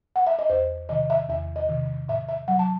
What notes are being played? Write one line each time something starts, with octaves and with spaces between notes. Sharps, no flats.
F#5
E5
D#5
E2 C5
C3 D#3 D#5
E5
E2 E5
D#5
C3 D#3
A2 E5
E5
F#3 F#5
A5